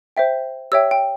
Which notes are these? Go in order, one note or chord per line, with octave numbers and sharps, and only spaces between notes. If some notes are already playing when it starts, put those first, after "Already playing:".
C5 E5 G5
G4 C#5 E5 G5 E6
G5